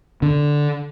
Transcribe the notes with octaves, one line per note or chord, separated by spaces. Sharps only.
D3